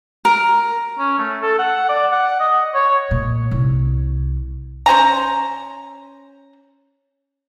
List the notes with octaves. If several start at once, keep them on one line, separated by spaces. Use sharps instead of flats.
A#4
C#4
A3
A4
F#5
D5
F#5
D#5
C#5
A#2
C2
C#4 C5 G#5 A#5